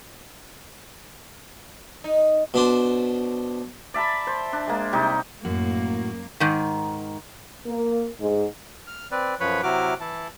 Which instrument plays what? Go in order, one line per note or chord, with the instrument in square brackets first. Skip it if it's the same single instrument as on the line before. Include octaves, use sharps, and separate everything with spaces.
[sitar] D#4
[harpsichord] B2 D4 C5
[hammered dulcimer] D5 E5 A5 B5
C5
D4
G#3 A#3
C3 G3 D#4 G4
[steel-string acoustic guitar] F#2 [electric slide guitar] A2 F#4 [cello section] A#3
[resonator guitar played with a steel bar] G#2 D#3
[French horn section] A#3
G#2
[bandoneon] F6
C4 B4 D5
F#2 F3 B4 C#5 B5
C3 F#3 E4 F#4 D6 F6
E3 E4 A5